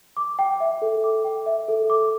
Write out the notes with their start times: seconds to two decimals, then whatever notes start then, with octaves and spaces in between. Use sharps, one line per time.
0.17 D6
0.39 G5
0.60 E5
0.82 A4
1.04 D6
1.24 G5
1.46 E5
1.68 A4
1.90 D6